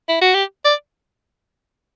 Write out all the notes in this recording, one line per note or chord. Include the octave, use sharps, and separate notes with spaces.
E4
F#4
G4
D5